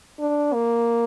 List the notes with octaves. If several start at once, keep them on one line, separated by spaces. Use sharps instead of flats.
D4
A#3